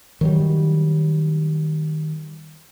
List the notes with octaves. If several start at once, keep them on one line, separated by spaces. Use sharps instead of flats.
D#3 F#3 G3